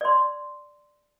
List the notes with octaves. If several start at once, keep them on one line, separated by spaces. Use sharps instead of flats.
D5 C6